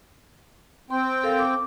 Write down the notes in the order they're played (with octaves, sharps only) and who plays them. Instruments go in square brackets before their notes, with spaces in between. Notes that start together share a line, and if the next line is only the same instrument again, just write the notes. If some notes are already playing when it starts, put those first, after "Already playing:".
[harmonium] C4 G5 [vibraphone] C6
[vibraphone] A4 A#4 F5
D6